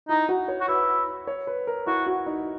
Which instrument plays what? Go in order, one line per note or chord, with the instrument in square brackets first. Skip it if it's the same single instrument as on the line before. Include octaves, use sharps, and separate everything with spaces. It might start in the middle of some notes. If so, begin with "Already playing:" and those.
[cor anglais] D#4 [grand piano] E4
[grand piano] F#4
C#5
[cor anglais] F#4
[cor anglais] E4 [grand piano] B4
[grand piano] C#5
B4
A#4
[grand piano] E4 [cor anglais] F#4
[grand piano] F#4
D#4